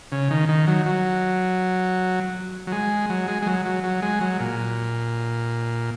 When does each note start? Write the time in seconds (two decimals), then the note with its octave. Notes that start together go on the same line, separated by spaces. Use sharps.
0.12 C#3
0.31 D#3
0.49 D#3
0.67 F#3
0.86 F#3
2.67 F#3
2.72 G#3
3.10 F#3
3.28 G#3
3.42 G#3
3.46 F#3
3.65 F#3
3.84 F#3
4.02 G#3
4.21 F#3
4.40 A#2